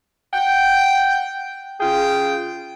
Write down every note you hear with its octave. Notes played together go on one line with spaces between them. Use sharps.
F#5 G5
C#3 F4 G#4 G5